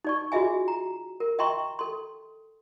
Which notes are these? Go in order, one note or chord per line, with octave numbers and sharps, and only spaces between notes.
D#4 D5 C#6
F4 F#4 G#4 D#5 E5 G#5
A#5
A#4
D#5 E5 G5 A#5 C6 C#6
A4 C6